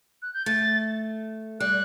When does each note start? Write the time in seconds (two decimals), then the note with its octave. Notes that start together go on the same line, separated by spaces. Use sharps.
0.22 F#6
0.34 G6
0.46 A3 A6
1.60 G3 F#6